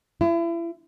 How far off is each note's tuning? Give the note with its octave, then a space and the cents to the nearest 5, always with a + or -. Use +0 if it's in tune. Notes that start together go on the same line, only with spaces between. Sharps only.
E4 +35